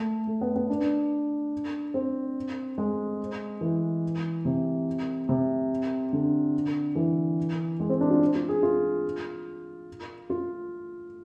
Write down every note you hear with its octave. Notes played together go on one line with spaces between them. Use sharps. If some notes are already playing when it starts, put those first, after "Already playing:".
Already playing: A3
A3
B3
B3
D4
C4
G#3
E3
C3
C3
D3
E3
G#3
C4
D4
F4
F4
G#4
F4
F4